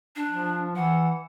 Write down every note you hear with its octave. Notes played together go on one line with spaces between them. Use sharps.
D4
F3
E3 F#5